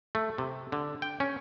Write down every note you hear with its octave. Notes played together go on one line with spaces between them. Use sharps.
A3
C3
D3
G5
C#4